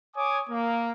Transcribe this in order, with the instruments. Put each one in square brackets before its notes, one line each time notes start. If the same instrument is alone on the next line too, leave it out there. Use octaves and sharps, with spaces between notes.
[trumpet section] C#5 G#5 D6 D#6
A#3